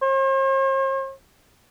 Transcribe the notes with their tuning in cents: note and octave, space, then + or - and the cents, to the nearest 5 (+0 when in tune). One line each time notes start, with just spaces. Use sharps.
C5 +45